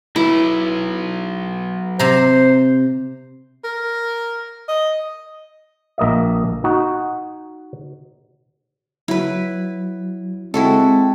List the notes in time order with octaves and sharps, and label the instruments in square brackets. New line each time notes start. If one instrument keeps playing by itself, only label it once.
[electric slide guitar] F#3 B4 [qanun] E4
[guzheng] C3 A#5 [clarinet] C5
[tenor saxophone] A#4
D#5
[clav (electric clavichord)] A#1 A#3 D#5 E5
D#4 F#4
[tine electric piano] F#3 [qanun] E4 B4
[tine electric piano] G#3 [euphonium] C4 [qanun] E4 F#4 A4